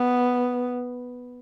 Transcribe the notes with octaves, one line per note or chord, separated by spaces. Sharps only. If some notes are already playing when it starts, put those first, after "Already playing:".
Already playing: B3